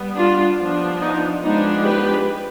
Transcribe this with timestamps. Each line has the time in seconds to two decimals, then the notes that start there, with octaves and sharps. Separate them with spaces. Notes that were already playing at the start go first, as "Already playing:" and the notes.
Already playing: G3 B3
0.16 D4 F4
0.59 F3 B3 D4
1.01 D#4
1.43 F3 G#3 B3 D4 D#4
1.85 G4 B4